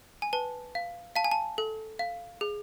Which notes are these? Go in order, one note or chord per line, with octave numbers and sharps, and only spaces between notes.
G#5
B4 A5
F5
F5 A5
G#5
A5
A4
F5
G#4